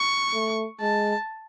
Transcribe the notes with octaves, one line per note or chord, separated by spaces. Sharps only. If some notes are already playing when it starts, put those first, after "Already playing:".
Already playing: C#6
A3
G#3 A5